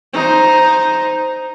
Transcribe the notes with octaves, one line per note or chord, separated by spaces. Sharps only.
D#4 C5